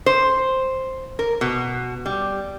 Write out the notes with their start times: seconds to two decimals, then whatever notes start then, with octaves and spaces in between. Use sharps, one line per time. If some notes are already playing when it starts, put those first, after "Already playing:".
0.06 C5
1.19 A#4
1.41 B2
2.06 G3